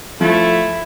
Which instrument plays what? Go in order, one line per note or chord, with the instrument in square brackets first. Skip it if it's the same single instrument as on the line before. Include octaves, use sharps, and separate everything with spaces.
[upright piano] F3 [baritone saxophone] A3 [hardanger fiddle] E4